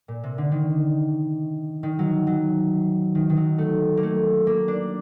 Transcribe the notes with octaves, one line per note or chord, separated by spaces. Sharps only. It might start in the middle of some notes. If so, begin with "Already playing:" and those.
A#2
C3
D3
D#3
D#3
F#3
F#3
D#3
D#3
F#3
A3
A#3
A3
A#3
D4